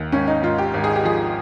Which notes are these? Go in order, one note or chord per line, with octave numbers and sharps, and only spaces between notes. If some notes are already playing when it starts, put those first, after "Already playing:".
Already playing: D#2
G#1 C#4
D#4
G#2 F4
G4
G#1
G#4
G4
F3 G#4